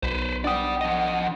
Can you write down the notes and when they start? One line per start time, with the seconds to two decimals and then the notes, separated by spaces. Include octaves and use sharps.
0.03 B1 B4 C5
0.45 D4 D5 F#5 G5 D#6
0.81 F3 D#5